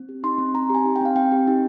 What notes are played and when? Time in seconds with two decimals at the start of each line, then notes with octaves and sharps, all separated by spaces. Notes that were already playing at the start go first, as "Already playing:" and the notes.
Already playing: C4
0.09 G4
0.24 D#4 C6
0.38 C4
0.54 C4 A#5
0.70 G4 G#5
0.85 D#4
0.96 G5
1.01 C4 F5
1.16 C4 G5
1.32 G4
1.47 D#4